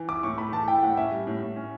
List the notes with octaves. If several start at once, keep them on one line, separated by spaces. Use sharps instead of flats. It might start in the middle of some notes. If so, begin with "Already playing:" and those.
Already playing: E3
E4 D6
A2 C#6
A3 B5
E3 A5
E4 G5
A2 F#5
C#4 E5
G3
A2
A2
C#4